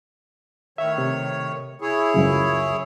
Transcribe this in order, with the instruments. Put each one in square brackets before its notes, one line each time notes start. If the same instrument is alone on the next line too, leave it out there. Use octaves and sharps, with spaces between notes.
[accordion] A2 D#3 C#5 [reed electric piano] E5
[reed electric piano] C3
[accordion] E4 G#4 C#5
[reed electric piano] C#2 F#2 C#3